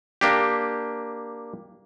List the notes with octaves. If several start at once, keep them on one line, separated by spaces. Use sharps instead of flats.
A#3 D4 G4